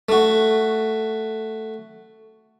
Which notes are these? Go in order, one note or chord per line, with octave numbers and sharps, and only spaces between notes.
A3 F#4